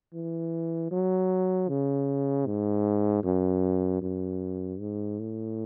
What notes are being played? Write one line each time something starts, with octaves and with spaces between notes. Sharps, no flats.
E3
F#3
C#3
G#2
F#2
F#2
G#2
A2